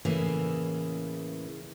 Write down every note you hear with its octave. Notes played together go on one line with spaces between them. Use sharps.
A2 C#3 E3 A#3 G#4